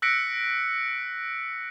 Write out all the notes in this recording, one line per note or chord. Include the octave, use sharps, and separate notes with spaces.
E6 F#6 A#6 B6 C#7 D7